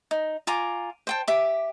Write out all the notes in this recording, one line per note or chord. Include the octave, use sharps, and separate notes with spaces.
D#4
F4 G#5 A#5 D6
C5 G5 A5
G4 E5 D6